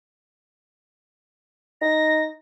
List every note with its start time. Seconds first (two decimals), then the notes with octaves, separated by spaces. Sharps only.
1.82 D#4 A#6